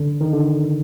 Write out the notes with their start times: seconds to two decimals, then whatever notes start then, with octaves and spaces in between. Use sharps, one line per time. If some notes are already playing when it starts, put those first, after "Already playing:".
Already playing: D3
0.21 D#3
0.33 D3